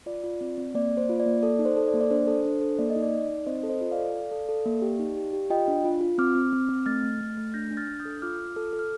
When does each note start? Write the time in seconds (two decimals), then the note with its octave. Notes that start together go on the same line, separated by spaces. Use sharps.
0.06 F4 D5
0.24 F4
0.41 C4
0.58 C4
0.75 A#3 D5
0.91 A#3
0.97 C5
1.09 F4
1.20 D5
1.26 A#3
1.42 A4 D5
1.59 D#4
1.65 C5
1.77 A4
1.88 D5
1.94 A#3
2.01 D5
2.10 D4 C5
2.27 A4
2.45 D4
2.61 A4
2.79 A#3 D5
2.90 D#5
2.96 D#4
3.02 D5
3.12 D#4
3.29 D#4
3.47 C4 C5 D#5
3.63 A4
3.69 C5 D#5
3.81 F4
3.92 D5 F5
3.98 A4
4.14 A4
4.31 A4
4.49 A4
4.66 A#3
4.82 G4
4.99 D#4
5.17 G4
5.33 G4
5.50 F4 D#5 G5
5.68 D4
5.84 F4
6.01 F4
6.18 C4 D6 F6
6.35 C4
6.53 C4
6.69 C4
6.86 A3 F6 A6
7.03 A3
7.21 A3
7.37 A3
7.54 D4 G6 A#6
7.71 D4
7.77 F6 A6
7.88 D4
8.00 D#6 G6
8.05 A4
8.22 F4 D6 F6
8.39 F4
8.56 A4
8.73 A4
8.79 F6